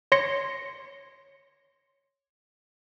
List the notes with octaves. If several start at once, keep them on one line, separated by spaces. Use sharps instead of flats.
C#5 C6 A#6 C#7